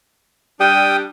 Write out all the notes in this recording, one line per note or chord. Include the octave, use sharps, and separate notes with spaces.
G3 D4 G5 D#6